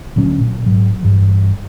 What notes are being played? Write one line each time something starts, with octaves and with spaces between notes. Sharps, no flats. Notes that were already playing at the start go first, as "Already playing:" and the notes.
D2 A#2 F#3 C#4
A#2
G#2 F#3
G2 E3